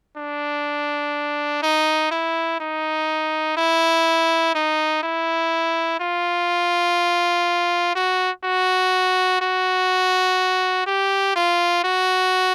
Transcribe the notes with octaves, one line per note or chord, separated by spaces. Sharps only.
D4
D#4
E4
D#4
E4
D#4
E4
F4
F#4
F#4
F#4
G4
F4
F#4